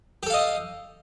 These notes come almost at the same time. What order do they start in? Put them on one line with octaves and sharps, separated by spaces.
G4 A4 F5 D#5